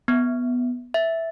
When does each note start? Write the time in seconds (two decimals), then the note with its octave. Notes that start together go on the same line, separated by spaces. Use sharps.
0.08 B3
0.94 E5